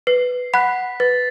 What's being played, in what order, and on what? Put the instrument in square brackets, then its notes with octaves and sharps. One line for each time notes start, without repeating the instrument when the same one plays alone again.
[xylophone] B4 [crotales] C7
[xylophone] F#5 B5 F#6 [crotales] B6
[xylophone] B4 [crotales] A6